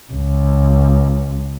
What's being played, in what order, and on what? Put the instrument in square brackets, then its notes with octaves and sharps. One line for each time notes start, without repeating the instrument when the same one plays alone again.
[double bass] C#2